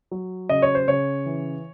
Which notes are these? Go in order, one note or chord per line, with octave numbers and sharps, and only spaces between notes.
F#3
C#3 D#5
C#5
C5
C#3 C#5
E3